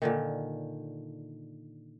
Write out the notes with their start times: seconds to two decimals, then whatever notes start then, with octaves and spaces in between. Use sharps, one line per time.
0.02 A#2 D3 D#3